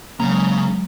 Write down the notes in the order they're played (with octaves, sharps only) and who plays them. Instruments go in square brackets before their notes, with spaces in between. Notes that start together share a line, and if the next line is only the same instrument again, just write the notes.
[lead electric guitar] C#3 [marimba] F#3 G#3 [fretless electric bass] A#3 [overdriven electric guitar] A#5